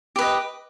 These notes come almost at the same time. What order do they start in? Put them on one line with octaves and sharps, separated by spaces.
G4 B4 D#5